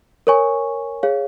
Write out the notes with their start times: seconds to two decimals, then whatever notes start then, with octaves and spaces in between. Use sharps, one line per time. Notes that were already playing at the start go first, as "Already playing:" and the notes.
0.27 A#4 C#5 G#5 C#6
1.03 G#4 C#5 F5